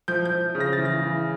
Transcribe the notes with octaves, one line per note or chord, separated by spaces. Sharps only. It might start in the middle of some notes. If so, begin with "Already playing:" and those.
F3 G6
G6
F3
C#3
A#6
E3 A6
A#6
E3